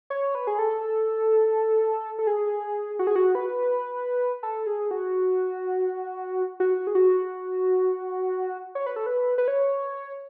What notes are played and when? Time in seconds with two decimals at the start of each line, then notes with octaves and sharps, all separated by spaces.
0.10 C#5
0.35 B4
0.47 G#4
0.59 A4
2.19 A4
2.27 G#4
2.99 F#4
3.07 G#4
3.16 F#4
3.35 B4
4.43 A4
4.66 G#4
4.91 F#4
6.60 F#4
6.87 G#4
6.95 F#4
8.75 C#5
8.86 B4
8.96 A4
9.06 B4
9.38 B4
9.48 C#5